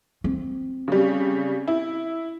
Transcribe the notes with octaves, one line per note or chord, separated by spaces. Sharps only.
C4
C#3 G3
E4